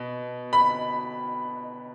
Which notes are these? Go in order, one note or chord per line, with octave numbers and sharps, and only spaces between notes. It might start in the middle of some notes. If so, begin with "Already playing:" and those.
Already playing: B2
B5